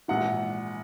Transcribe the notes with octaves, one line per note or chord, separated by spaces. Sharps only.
A#1 G#2 E3 F#5